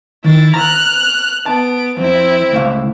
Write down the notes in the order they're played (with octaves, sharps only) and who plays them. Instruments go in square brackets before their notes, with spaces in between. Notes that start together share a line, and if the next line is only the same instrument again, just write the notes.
[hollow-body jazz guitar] D#3 [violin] E4 A6
[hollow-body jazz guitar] A#5 [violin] F6 F#6
[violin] B3 D7 [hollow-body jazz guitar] A5
[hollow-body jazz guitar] F2 [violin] C4 E4
[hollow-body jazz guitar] C#2 A2 F5